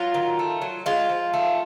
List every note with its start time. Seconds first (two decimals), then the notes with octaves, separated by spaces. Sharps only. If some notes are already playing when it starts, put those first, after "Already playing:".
Already playing: F#3 F4
0.14 D#3
0.39 A3
0.62 F#3
0.86 G#3 F4
1.09 F3
1.33 A3